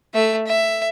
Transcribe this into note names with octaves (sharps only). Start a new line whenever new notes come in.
A3 E5
E5